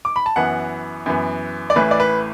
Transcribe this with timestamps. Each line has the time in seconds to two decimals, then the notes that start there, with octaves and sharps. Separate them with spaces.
0.05 D6
0.16 B5
0.26 A5
0.36 F#2 E3 B3 F#5
1.06 F#2 E3 B3
1.70 D5
1.76 A1 A2 E3 B4
1.91 D5
2.00 B4